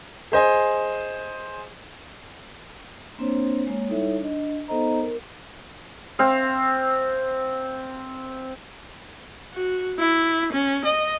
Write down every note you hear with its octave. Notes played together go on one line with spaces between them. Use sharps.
G#4 C5 D#5 G#5
A#3 C4 D4 C5 C#5
G#3 A#3 C#5
G3 D#4 E4 A4 C#5 E5
D4 D#5
B3 D#4 A4 C5 D#5 A#5
A#4
C4 F5
F#4
E4
C#4
D#5